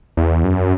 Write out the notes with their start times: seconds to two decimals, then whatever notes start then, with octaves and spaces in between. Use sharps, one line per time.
0.17 E2
0.44 F#2